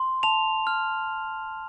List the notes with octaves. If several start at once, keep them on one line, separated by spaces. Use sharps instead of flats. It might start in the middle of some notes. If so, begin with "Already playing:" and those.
Already playing: C6
A5 F7
F6